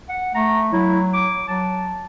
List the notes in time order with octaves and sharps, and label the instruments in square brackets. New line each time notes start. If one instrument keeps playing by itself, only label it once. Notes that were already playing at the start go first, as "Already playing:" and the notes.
[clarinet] F#5
[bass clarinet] A3 [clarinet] A#5
[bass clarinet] F#3 [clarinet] E4
[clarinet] D6
[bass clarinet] F#3 [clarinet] A5